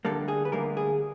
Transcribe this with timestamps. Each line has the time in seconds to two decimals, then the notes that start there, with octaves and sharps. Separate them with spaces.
0.05 D2 D3 G3 A#3 A4
0.28 G#4
0.45 B4
0.52 D2 D3 G3 A#3 A#4
0.77 G#4